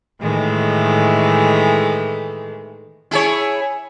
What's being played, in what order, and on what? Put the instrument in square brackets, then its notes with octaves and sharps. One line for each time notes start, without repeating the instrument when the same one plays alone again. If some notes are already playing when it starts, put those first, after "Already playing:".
[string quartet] A2 D#3 E3 G#3 A3
[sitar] E4 G#4 C#5